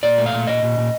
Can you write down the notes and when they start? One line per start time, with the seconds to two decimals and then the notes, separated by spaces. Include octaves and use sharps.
0.03 A#2 D5
0.18 A3
0.26 F5
0.33 A#2
0.47 A#2 D#5
0.63 A#2
0.78 A#2